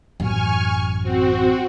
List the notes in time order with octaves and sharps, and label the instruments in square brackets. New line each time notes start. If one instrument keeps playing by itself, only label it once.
[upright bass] A1 F#2 [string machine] G#5 C#6 F6
[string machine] C4 F#4